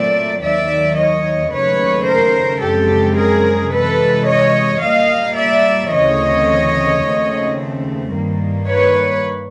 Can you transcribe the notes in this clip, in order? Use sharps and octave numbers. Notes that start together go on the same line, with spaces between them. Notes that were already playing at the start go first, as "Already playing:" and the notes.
Already playing: A#2 F#3 A3 C4 D5 E5
D#2 D#3 F#3 D5 E5
C#5 D#5
D#2 C#3 F#3 A3 B4 C#5
A#4 C5
F#2 C#3 F3 G#3 C4 G4 A4
G#4 A#4
C3 E3 G#3 A4 B4
C#5 D#5
A#2 G3 A#3 D#5 F5
D5 E5
D2 C#3 E3 A3 C4 C#5 D#5
D#2 C#3 F3 A3 C4
G2 D#3 G3 A#3
B4 C#5